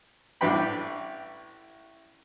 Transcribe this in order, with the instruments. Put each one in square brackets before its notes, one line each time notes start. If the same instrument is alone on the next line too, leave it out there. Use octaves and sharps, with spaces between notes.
[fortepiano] A1 G3 D4 B4 G5 B5